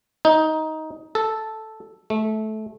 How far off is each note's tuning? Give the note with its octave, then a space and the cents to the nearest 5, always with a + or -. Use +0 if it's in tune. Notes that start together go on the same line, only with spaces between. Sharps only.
D#4 +15
A4 -5
A3 -20